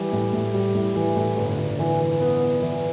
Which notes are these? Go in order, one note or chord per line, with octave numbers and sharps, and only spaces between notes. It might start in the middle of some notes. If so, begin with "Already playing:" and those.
Already playing: E3 G3
A2
A2
G3
A2
E3
A2
G1
G1
E3
E3
B3
B3
E3